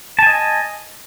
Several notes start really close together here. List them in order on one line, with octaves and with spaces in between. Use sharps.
A5 G#5 D#5